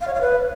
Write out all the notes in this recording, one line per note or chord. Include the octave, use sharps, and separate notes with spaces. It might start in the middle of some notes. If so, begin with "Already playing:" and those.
F5
C#5
F5
B4